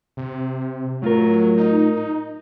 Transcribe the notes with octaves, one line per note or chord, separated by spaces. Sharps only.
C3
A2 F#3 F4 A#4
D#4